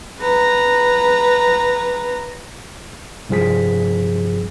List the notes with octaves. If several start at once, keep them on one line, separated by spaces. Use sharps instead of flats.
B4 A#5
C2 G2 F3 G#4 B6